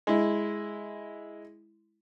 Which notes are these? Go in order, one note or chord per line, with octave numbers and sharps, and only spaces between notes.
G#3 E4